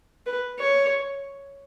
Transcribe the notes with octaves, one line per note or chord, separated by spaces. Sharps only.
B4
C#5